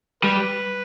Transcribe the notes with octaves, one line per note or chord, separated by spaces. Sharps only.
G3 B4